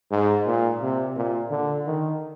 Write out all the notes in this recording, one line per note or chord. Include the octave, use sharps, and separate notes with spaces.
G#2
A#2
C3
A#2
D3
D#3